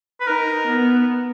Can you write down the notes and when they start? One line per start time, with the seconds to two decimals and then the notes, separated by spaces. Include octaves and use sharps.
0.20 B4
0.27 D#4 A#4
0.67 B3